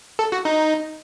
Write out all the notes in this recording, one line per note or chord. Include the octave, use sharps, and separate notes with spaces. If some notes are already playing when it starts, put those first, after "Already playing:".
A4
F#4
D#4